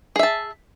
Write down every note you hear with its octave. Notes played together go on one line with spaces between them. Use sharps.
G#4 E5 A5